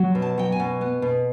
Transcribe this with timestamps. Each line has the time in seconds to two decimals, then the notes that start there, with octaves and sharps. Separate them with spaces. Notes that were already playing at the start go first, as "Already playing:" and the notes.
Already playing: F#3
0.15 B2
0.22 A5
0.38 F#3 G5
0.52 G#5
0.60 B2
0.81 B3
1.02 B2